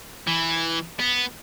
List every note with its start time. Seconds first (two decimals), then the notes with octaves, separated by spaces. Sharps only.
0.27 E3
0.99 B3